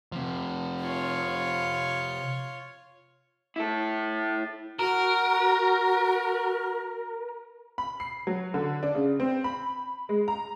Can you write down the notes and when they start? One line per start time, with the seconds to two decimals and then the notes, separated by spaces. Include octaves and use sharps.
0.12 C3 F3
0.81 F4 C#5
3.56 E4 A4
4.79 F#4 A#4
7.78 B5
8.00 C7
8.27 F#3
8.54 D3
8.83 D4
8.95 C#3
9.20 C4
9.44 B5
10.09 G#3
10.28 A#5